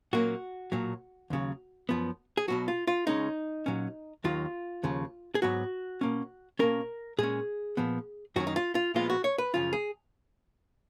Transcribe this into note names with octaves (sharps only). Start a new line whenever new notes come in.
A#2 F#3 A#3 C#4 F#4
B1 A#2 F#3
D#2 C#3 F#3
F#2 F3 B3
G#4
B1 B2 F#3 F#4
F4
F4
C#2 C#3 G#3 C#4 D#4
A#2 F#3 C#4
D#2 D#3 F#3 F4
D#2 C#3 F3
G#4
G#2 F#3 B3 F#4
B2 A#3 C#4
B2 A#3 C#4 A#4
A#2 G#3 C#4 G#4
A#2 F3 B3
F#2 D#3 F#3 C#4 F#4
D#4
F4
F4
A#2 F3 G#3 B3 F4
F#4
C#5
B4
F#2 C#3 F3 F4
G#4